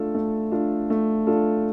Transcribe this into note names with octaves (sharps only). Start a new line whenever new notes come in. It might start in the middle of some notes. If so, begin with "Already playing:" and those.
Already playing: A3 D4 F4 A4
A3
D4 F4 A4
A3
D4 F4 A4